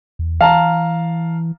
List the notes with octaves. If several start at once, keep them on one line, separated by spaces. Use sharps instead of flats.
E2
E3 F5 A5 A#5